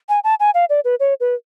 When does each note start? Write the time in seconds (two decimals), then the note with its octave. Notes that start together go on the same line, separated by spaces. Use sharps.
0.09 G#5
0.24 A5
0.40 G#5
0.54 F5
0.70 D5
0.85 B4
1.00 C#5
1.20 B4